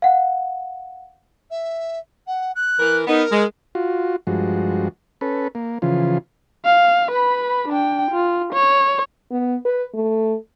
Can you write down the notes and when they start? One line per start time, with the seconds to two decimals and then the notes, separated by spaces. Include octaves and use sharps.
0.02 F5 F#5
1.50 E5
2.27 F#5
2.55 F#6
2.78 E3 A#4
3.07 B3 D#4 A#4
3.30 G#3
3.75 F4 F#4
4.27 G2 F3 G#3 F#4
5.21 C#4 A4 B4
5.55 A#3
5.82 C#3 E3 F3 F4
6.65 F5
7.11 B4 B5
7.69 D4 G5
8.11 F4
8.53 C#5
9.31 B3
9.65 B4
9.94 A3